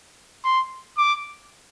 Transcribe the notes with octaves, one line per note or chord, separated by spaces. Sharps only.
C6
D6